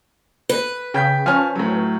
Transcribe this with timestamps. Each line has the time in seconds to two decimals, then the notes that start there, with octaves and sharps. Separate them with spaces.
0.49 B4
0.94 C#3 G5 G6 B6
1.26 F3 C#4 G#5 A5 F6
1.55 A2 F#3